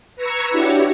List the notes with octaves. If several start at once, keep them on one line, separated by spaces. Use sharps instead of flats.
B4 A#5 C#6 E6 G#6 C#7
D4 E4 F#4 G4 C#5